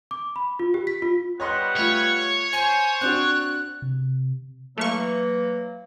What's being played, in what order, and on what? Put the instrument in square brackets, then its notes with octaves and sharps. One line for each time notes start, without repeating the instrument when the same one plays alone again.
[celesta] D6
B5
F4
G4
B6
F4
[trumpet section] G3 B3 F#5 [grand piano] C#5 D#5 C6
[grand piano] A3 F4 [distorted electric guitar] C#5
[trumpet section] C5 [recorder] G#5 [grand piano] F7
[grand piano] C4 D4 F#4 [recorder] F#6
[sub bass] C3
[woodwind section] E3 F#3 A#3 [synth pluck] A3 F5 C#6